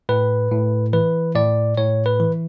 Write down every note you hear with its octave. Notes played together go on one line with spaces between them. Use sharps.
A2 B4
A2
E3 B4
A2 D5
A2 C#5
B4
E3